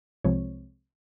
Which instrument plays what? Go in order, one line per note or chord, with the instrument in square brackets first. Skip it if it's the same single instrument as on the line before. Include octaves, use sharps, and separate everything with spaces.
[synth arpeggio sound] C2 C3 F3 G#3 C4 C#5